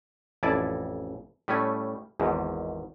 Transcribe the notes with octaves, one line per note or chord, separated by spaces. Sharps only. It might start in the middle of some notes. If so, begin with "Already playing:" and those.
A1 F2 E4 D5 G#5 A5
A2 G3 A3 C#4 G#5
G#1 E2 G#2